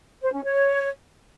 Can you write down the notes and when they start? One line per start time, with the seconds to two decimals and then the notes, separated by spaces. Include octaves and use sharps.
0.22 C5
0.33 C#4
0.44 C#5